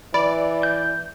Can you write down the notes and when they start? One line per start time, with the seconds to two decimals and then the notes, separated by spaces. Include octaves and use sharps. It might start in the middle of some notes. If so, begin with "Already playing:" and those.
0.14 E3 D5 B5
0.63 G6